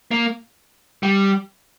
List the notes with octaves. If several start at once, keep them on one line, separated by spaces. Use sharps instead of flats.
A#3
G3